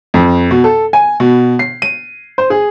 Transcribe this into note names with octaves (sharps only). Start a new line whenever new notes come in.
F2
B2
A4
G#5
B2
C7
D#7
C5
G#4